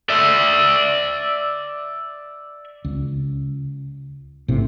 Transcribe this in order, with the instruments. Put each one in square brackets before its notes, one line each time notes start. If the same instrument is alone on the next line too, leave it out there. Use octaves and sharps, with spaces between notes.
[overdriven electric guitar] D5 E5
[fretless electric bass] C#2
A#1 A2 C3